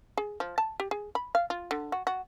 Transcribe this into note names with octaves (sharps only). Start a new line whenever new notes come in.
G#4
F3
A5
G4
G#4
B5
F5
F4
D3
F#4
F#4